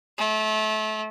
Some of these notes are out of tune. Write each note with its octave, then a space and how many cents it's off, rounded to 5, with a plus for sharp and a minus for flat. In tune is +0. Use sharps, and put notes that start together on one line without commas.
A3 -30